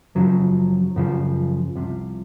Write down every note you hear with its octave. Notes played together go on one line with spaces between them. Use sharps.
F#2 C#3 F3 F#3
F#2 C#3 F3
C2 C3 F3